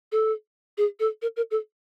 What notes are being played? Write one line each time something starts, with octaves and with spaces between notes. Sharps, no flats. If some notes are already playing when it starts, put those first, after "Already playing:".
A4
G#4
A4
A#4
A#4
A4